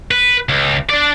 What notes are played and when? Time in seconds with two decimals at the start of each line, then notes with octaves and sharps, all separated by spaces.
0.11 B4
0.49 C#2
0.90 D4 D5